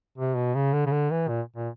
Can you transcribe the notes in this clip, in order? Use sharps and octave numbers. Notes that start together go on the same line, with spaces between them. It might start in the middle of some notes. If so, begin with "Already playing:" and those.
C3
B2
C#3
D3
C#3
D3
E3
A#2
A#2